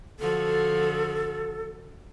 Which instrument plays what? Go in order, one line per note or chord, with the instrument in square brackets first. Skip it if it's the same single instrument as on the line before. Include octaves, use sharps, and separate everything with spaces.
[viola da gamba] D3 F3 F#4 [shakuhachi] A4